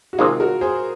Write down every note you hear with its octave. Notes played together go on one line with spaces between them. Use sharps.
F#4
C3 D#3 G#3 D#4 F4 G#4
F#4 A#4
G#4 C5